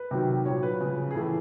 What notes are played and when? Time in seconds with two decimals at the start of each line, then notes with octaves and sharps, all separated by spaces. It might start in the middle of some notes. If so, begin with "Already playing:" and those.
Already playing: B4
0.11 C3 D#3 F#3
0.45 A#2 F#3 C#5
0.63 B4
0.80 C#3 F3
1.11 G#4
1.15 A2 E3 A4